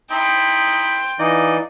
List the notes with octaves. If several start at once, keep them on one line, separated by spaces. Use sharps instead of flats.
D#4 E4 G5 C6
E3 D#4 F4 D5 D#5